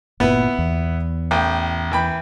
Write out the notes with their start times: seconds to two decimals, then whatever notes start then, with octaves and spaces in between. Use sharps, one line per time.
0.20 G1 A#2 B3 E4 B4
0.58 E2
1.31 A1 G5
1.92 E3 G5 B5